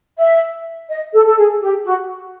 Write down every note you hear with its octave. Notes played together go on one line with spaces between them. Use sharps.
E5
D#5
A4
A4
G#4
G4
F#4